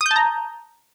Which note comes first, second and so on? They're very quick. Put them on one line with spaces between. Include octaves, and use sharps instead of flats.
D#6 G6 A5 A#5